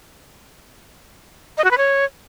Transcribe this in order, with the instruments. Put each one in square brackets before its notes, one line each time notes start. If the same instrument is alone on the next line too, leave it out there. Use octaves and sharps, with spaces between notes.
[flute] D#5
F#4
B4
C#5